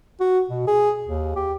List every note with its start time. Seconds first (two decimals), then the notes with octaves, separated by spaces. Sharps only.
0.21 F#4
0.50 B2
0.67 G#4
1.07 D#2
1.36 G4